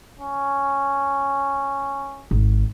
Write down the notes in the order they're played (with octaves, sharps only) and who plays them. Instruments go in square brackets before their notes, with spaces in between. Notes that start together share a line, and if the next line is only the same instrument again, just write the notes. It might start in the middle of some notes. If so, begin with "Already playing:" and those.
[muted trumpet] C#4
[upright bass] G#1